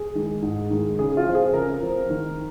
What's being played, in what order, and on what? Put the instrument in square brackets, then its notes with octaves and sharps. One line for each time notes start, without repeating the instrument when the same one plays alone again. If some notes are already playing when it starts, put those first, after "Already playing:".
Already playing: [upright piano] G#4
D#3 G#3
G#2
D#3 G#3
C#3 G#4
F4
F3 C4
G#4
C#3 A#4
F3 C4
D#3